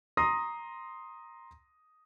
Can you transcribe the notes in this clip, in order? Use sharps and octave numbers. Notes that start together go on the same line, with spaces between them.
A#5 C6 D#6 A#6